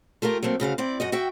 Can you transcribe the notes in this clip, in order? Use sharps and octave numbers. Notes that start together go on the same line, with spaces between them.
A3 F4 G4 A#4
F#3 A3 A#3 C4
D2 C#3 F#4 F5
C4 E4 D5
F#2 F#4 D#5
F#4 E5 G5